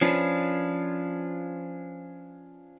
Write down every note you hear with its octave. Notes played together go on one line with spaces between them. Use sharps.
F3 C#4 D4 F4 B4